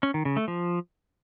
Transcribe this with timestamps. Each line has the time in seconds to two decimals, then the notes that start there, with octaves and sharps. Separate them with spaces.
0.03 C#4
0.14 D#3
0.25 C#3
0.37 A3
0.48 F3